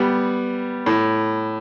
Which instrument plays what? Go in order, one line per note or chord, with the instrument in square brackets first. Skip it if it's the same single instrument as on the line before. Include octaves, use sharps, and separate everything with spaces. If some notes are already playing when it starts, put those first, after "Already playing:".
Already playing: [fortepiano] G3 B3
A2